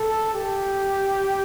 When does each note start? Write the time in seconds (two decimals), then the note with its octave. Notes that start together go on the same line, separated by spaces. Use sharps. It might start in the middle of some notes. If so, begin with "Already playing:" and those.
Already playing: A4
0.34 G4